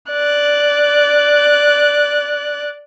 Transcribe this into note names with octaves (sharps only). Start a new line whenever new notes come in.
D5 F#6